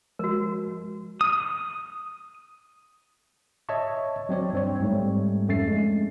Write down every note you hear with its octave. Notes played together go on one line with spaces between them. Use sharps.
F3 G#3 F#4 A#4
D#6
C#5 D#5 E5 A5 C#6
F#3 C4 C#5 D5
G2 C4 C#5
G#2 G3 A3
F2 A3 C#4 A6 C7
G#3